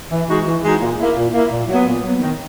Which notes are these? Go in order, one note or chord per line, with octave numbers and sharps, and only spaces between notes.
E3
G#3 D#4 F#4
E3
G#3 D#4 F#4
A#2
A#3 E4
A#2
A#3 E4
A#2
F#3 B3
A#2
F#3 B3
D#3